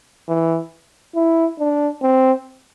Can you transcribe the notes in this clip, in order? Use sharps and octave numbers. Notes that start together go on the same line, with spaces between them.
E3
E4
D4
C4